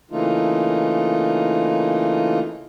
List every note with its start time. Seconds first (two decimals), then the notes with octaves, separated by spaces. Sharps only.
0.11 C#3 E3 A3 A#3 D#4 F4